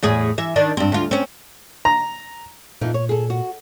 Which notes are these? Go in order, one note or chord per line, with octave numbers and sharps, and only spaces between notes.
E2 A2 G#4
E3 E5
D#3 D4
G2 C4
D2 F4
C4 C#4
A#5
F2 A#2 E3 D#4
C#5
G#4 A4
F#4